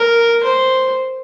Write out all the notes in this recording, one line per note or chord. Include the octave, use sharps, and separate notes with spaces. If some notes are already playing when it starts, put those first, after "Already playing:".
Already playing: A#4
C5